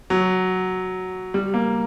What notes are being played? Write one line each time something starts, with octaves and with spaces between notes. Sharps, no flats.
F#3
G3
A#3